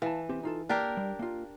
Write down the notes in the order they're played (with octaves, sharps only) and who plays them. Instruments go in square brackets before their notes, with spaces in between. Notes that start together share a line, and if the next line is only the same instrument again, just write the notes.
[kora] E3 [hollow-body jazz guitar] F5 A5
[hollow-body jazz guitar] C4 G4
D#4 F4 A4
[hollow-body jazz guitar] A#3 [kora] D4 G4 A#4
[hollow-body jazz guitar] G3
A#3 F4